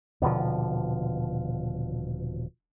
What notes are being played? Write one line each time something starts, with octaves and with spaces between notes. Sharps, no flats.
D#1 B2 D3 F3